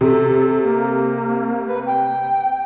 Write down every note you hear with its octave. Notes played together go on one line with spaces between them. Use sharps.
C3 A4
A4
A#3
B4
G5